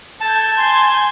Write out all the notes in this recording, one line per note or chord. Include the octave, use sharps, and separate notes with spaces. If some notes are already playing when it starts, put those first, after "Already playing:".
A4 A5 G6 G#6
G#5 C6